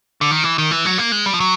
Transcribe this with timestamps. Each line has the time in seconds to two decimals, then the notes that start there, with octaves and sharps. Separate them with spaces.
0.21 D3
0.31 D#3
0.44 E3
0.58 D#3
0.71 E3
0.85 F#3
0.98 A#3
1.12 G#3
1.26 G3
1.34 F3
1.40 F#3